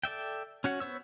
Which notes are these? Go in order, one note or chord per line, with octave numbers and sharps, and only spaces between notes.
A4 D5 E5 G5
C#4 F#4 C#5 F#5
B3 C5 C#5 E6